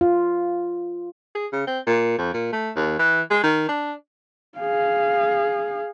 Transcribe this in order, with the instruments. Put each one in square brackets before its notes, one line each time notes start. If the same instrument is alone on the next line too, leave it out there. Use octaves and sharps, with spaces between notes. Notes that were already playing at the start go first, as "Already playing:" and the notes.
[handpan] F4
[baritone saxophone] G#4
C#3
C4
A#2
F2
A#2
A3
D#2
E3
G#3
D#3
D4
[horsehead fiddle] G#4 F5